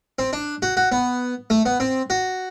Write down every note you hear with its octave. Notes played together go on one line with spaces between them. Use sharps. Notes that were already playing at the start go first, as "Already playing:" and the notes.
C4
D4
F#4
F#4
B3
A3
B3
C4
F#4